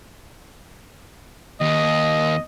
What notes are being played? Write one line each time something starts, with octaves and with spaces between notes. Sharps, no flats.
D#2 D#5